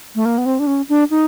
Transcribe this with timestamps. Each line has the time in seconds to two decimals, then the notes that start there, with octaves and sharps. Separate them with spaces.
0.15 A3
0.25 A#3
0.38 B3
0.46 C4
0.59 D4
0.67 C#4
0.89 D4
1.11 D#4